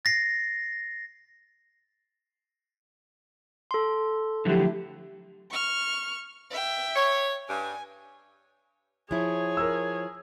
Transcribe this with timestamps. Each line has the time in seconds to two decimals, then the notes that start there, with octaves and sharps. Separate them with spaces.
0.05 A6 A#6 C7
3.71 A4 C6
4.45 D3 F3 F#3 A3 E4 G4
5.51 C#6 F6
6.50 E5 G5
6.95 C#5
7.49 G2 G#5
9.11 F3 E4 G#4 C#5
9.57 A#4 E6